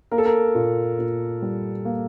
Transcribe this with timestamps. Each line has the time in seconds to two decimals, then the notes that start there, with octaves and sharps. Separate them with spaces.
0.11 A#3 A#4
0.18 A4
0.25 A#4
0.55 A#2
0.99 A#2
1.42 G3
1.85 A#3